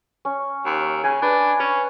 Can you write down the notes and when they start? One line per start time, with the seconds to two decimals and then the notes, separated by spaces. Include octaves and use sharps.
0.25 C#4
0.66 D#2
1.04 C#3 G#5
1.22 D4 B4
1.60 C#4 C#5